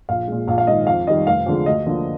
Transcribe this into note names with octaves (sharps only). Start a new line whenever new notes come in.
A#1 F5
A#2 G#3
A#1 F5
F5
G#2 D#3 D#5
F2 F5
D#3 G3 D#5
F1 F5
F2 D3 G#3
D2 D#5
D3 F3 A#3